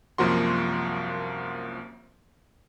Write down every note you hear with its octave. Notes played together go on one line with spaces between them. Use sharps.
C2 F#2 F3 A#3 F#4 C6